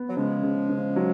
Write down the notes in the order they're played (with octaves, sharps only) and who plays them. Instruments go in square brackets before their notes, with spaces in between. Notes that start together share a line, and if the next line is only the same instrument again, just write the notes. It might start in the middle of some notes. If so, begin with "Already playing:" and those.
Already playing: [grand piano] B3
[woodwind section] F#3
[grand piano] C#3 [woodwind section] F3 G#3
[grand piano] C#3
C#3
F#3